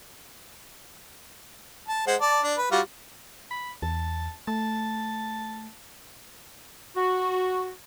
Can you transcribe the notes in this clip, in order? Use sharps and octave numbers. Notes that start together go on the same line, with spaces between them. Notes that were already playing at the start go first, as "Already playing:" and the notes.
A5
G#3 C5 F#5
D5 A5
D4
B4
G3 F4 F#4
B5
E2 A5
A3 A5
F#4